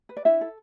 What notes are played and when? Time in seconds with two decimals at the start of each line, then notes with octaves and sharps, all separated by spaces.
0.09 B4
0.17 D5
0.25 D4 E4 E5
0.41 A4